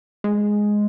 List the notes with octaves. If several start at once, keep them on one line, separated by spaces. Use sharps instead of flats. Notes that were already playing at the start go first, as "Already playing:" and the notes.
G#3